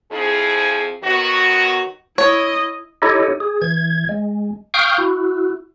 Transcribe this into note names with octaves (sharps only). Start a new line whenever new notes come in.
F2 F3 E4 G#4
D#3 F#3 B3 F#4
E4 C#5 D#5
D#4 E4 G4 A4 C#5 D#5
G#4
E3 G#6
G#3
F5 G5 C#6 D#6 F6 G6
E4 F#4